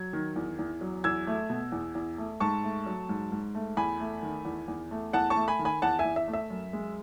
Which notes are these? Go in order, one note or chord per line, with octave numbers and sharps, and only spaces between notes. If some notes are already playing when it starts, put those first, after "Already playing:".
Already playing: F#3 G#6
D#3
E2
E2
F#3
E2 E6 G#6
A3
B2
E2
E2
A3
G#2 A5 C#6
A3
F#3
G#2
G#2
A3
E2 G#5 B5
A3
D#3
E2
E2
A3
E2 F#5 A5
A5 C#6
A3
G#5 B5
D#3
G#5 B5
E2 F#5 A5
E5 G#5
E2
E5
A3
E5
F#2
G#3